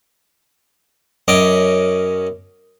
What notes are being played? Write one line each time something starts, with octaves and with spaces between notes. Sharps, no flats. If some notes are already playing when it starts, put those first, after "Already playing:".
F#2 C#4 D#5 D6